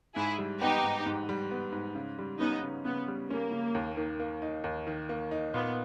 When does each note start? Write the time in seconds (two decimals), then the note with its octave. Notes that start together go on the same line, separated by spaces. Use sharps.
0.16 G#2 E4 G#4
0.38 G3
0.61 B3 D#4 G4
0.84 G#2
1.06 G#2
1.29 G3
1.51 B3
1.72 G#2
1.95 C#3
2.18 G3
2.40 B3 C#4 D#4
2.62 C#3
2.85 C#3 B3
3.08 G3
3.31 A#3 C#4
3.52 C#3
3.75 D#2
3.97 D#3
4.20 A#3
4.42 D#4
4.64 D#2
4.87 D#3
5.09 A#3
5.31 D#4
5.54 A#2 B3